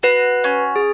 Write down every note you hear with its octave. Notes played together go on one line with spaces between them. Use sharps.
F#4 B4
C#4
G#4